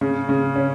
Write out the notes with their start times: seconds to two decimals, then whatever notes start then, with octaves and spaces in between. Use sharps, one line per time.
0.01 C#3
0.29 C#3
0.56 C#4